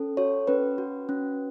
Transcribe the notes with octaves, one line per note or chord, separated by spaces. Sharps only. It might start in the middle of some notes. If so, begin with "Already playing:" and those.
Already playing: C#4 A4
F#4 C#5
C#4 B4
F#4
C#4